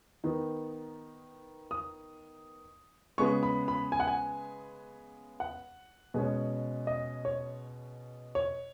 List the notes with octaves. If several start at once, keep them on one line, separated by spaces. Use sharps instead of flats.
D#3 B3 D#4
D#6
C#3 G#3 B3 C#6
B5
B5
G#5
F#5
G#5
F#5
B2 G#3 C#4
D#5
C#5
C#5